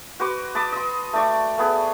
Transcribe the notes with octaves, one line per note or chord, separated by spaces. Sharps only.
F#4 B4 C5 D6
D#5 A5 B5 D6
D#5 C6
A3 D5 C#6
A3 B3 G#4